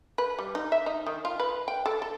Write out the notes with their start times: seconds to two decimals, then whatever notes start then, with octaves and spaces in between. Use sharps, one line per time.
0.18 B4
0.39 G3
0.55 D#4
0.72 E5
0.86 D#4
1.06 D#3
1.25 F4
1.40 B4
1.68 G5
1.86 A4
2.02 A4